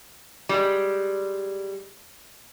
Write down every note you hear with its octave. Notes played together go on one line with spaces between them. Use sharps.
G3 G#3